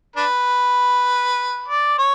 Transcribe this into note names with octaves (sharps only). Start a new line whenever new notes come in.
D4 B4
D5
C#5